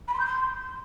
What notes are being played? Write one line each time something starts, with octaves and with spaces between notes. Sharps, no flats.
B5
C6
G6
C6